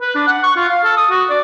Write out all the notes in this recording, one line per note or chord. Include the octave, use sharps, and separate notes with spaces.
B4
D4
F#5
C#6
F4
F5
A4
D#6
F#4
D5